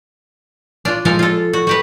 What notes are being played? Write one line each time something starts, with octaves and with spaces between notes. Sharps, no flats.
D4 F4
F3 G#3 A4 A#4 G#5 A#5
F4 A4
F#4
F#4 G4 B4